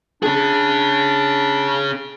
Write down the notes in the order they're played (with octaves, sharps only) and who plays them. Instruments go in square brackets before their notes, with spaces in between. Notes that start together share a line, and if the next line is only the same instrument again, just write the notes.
[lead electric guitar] C#4 G#4 [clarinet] D4